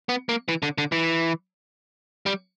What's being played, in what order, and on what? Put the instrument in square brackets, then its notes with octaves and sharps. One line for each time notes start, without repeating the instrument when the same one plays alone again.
[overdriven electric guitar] B3
A#3
E3
D3
D3
E3
G3